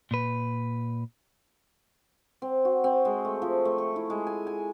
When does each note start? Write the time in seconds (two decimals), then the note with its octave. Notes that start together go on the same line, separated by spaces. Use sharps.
0.11 A#2 B4
2.42 C4
2.65 F#4
2.84 C4
3.05 G#3
3.25 A3
3.42 F3
3.65 A3
3.78 C#6
3.96 E4
4.10 G#3
4.27 G#5
4.47 G#5